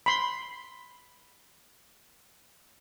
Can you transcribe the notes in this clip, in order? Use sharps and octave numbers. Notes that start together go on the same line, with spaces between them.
B5 C6